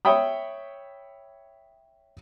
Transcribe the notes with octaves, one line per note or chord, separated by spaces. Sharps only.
C#5 E5 G5 B5 D#6